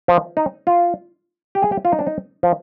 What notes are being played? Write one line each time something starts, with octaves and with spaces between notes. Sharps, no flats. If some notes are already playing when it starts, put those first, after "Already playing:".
F3
D#4
F4
G4
G#4
G4
F4
D#4
D4
D#4
F3